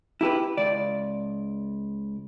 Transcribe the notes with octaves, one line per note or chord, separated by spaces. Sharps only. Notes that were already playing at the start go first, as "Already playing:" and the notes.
E4 G4 A#4 B4
C#2 D5